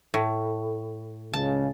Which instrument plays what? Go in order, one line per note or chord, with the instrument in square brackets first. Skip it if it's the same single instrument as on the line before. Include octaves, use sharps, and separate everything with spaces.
[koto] A2
[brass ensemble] C#2 C#3 [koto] A5